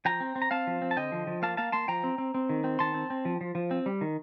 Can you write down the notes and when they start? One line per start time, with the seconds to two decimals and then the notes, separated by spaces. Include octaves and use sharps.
0.05 F3 G5 A#5
0.20 C4
0.36 C4
0.42 A#5
0.51 C4 F5 A5
0.67 F3
0.82 C4
0.91 A5
0.96 D3 D#5 G5
1.12 F3
1.27 F3
1.42 A#3 F5 A5
1.57 A#3 F5 A5
1.72 A#3 A5 C6
1.88 F3 G5 A#5
2.04 C4
2.18 C4
2.34 C4
2.49 D#3
2.64 C4
2.79 D#3 A5 C6
2.94 C4
3.10 C4
3.25 F3
3.41 F3
3.55 F3
3.71 C4
3.86 G3
4.01 D#3